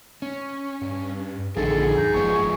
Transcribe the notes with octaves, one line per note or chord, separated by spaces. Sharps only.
C#4
G2
A#1 D3 D#3 F3 G#4 A4
F#2 D#4
F#1 F3 G#3 B3 C#6